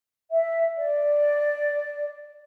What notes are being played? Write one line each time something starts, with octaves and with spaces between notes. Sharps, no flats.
E5
D5